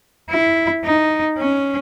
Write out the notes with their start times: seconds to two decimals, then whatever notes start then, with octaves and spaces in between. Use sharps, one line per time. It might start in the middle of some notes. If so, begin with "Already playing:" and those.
0.30 E4
0.85 D#4
1.38 C#4